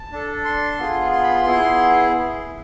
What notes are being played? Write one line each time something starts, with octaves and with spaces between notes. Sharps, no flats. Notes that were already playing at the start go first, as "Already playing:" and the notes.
Already playing: A5
D4 A4
C6
B3 F4 G#4
C6
B5
C6
B3 E4 G#4